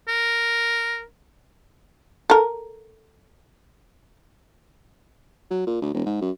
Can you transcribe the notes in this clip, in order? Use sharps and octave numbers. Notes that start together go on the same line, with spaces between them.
A#4
A4 A#4
F#3
A#2
D2
E1
G#2
F#2